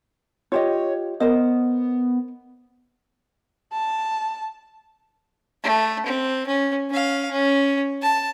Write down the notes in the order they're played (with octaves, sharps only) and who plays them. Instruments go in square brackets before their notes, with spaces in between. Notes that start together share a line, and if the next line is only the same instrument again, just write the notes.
[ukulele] F4 G4 D#5 [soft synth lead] C#5
[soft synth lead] B3 [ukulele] A#4 C5 D#5
[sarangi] A5
[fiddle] A3
C4
C#4
C#4 F5
C#4
A5